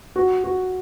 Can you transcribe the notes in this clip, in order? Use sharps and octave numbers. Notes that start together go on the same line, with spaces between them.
F#4
F#4